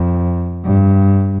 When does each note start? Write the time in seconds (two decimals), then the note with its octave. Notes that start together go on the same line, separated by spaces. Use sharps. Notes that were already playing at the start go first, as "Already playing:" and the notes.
Already playing: F2
0.65 G2